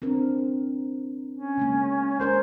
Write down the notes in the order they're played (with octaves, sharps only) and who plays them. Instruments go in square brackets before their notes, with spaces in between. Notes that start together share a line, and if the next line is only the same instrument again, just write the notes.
[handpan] C4 D4 A#4
[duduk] C#4
[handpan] C#3 G#3 A#3
[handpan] G#3 A#4 C#5 [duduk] C5